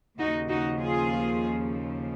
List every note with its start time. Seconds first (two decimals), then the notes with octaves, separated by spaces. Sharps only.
0.18 D#2 C#3 F3 D#4 F#4
0.49 D#4 F#4
0.79 F4 G#4